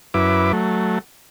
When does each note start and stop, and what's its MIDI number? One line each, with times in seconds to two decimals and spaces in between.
0.14 0.52 42
0.14 0.52 64
0.14 0.52 71
0.14 0.52 86
0.53 0.99 54
0.53 0.99 57